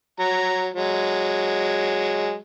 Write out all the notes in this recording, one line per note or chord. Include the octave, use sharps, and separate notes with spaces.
F#3 A#5
F#3 G#3